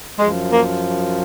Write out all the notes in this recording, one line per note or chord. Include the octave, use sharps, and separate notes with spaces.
F#2 F3 G#3
A#3